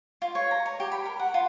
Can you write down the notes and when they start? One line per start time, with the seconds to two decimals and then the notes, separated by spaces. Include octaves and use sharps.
0.22 F4
0.35 C#5
0.51 A#5
0.66 C#5
0.80 G4
0.92 B5
1.05 A#4
1.19 F#5
1.34 F4